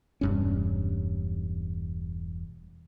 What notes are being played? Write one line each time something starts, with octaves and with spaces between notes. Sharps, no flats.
E1 G2 C#4